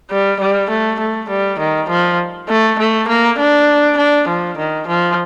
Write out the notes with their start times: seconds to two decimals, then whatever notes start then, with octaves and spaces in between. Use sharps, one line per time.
0.11 G3
0.40 G3
0.70 A3
1.00 A3
1.30 G3
1.59 D#3
1.89 F3
2.49 A3
2.79 A3
3.09 A#3
3.39 D4
3.98 D4
4.28 F3
4.58 D#3
4.88 F3